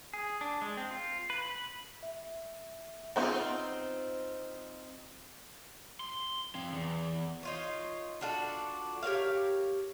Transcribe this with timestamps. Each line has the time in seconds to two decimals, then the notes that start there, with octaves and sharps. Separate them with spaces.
0.14 G#4
0.41 D4
0.61 G#3
0.77 C4
0.91 F4
1.30 B4
1.46 B5
2.03 E5
3.16 C#3 B3 C4 D#4 F4 E5
6.00 C6
6.55 C4 F5
6.72 E2
7.43 D#4 F4 C#5
8.21 D4 F4 F#4 A4
9.03 G4 A#4 C#5 F5